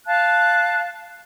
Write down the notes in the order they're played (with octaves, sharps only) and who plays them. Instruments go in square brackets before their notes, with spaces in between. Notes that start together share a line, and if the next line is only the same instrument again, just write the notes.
[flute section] F5 A5 F#6